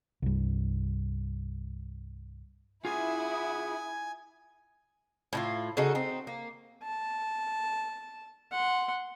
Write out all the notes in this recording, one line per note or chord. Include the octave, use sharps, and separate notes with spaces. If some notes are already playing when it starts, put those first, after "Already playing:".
C2 G2
E4 F4 G#4 E5 F#5 G#5 D#6
A2 E4 F4
C#3 D#4 F#4 A4
C4 D#4
A#3
A5
F#5 C6